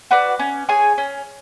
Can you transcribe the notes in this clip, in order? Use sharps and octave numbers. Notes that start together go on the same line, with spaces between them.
F#4 B4 D5
C#4
G#4 C#5 G#5
C#4